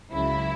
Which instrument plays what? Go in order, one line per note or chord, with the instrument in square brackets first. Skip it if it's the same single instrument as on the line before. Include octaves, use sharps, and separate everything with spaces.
[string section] C#2 C#3 F#3 E4